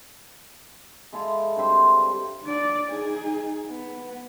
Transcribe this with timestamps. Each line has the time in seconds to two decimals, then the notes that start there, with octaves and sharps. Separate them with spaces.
1.12 G#3 E4 A4 F5
1.56 G2 C4 C5 E5
2.43 D4 D5
2.91 D#4 G#4
3.68 B3